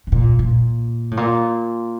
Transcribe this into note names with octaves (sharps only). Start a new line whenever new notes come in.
C3
A#2
A#2
A2
A#2